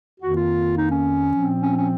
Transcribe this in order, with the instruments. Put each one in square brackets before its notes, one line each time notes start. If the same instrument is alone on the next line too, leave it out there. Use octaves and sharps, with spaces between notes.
[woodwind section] F2 D#3 A#3 F#4
F4
D#4
C#4
A#2 F3 C4
C#4
C#4